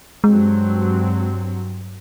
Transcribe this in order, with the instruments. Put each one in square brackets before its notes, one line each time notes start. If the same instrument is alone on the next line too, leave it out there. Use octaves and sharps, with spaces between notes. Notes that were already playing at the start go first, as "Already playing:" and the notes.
[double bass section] G2 F#3 C4 [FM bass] G#3